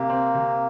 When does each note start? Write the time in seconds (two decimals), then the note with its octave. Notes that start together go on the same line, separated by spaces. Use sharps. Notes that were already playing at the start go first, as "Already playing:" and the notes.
Already playing: C3 A#3
0.09 C4
0.34 C3